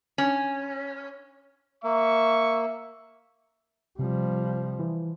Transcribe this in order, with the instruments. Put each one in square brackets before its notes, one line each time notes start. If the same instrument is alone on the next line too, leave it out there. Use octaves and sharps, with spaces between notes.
[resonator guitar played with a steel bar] C#4
[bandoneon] A#3 [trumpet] E5 [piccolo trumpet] C#6
[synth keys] C3 [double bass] F3 G3
[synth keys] E3